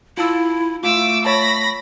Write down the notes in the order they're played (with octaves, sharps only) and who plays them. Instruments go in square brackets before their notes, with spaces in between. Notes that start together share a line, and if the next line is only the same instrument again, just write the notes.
[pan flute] E4 [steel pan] F4 A5 E6
[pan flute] A3 [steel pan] F4 [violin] D6 E6
[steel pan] C#5 A5 [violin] B5 A#6